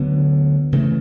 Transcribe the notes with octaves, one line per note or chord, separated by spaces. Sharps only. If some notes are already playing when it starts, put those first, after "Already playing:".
Already playing: D2 D3 F#3 B3
C#3 E3 A3